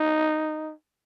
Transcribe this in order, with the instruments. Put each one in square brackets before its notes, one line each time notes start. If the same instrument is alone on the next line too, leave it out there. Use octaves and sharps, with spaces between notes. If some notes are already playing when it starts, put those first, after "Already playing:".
Already playing: [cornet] D#4